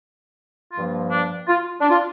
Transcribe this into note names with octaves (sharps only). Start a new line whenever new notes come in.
G2 F3 A#3 F4
D4
F4
D4
F4